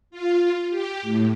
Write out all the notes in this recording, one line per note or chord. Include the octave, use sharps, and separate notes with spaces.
F4
G4
A2